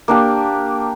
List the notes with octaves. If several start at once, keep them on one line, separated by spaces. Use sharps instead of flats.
A#3 D4 G4